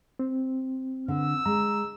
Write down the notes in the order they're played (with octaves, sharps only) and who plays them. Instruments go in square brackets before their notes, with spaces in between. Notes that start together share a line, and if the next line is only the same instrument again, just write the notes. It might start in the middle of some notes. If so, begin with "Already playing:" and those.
[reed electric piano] C4
[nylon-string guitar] D3 [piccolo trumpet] E6
[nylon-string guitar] G#3 [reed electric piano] A#5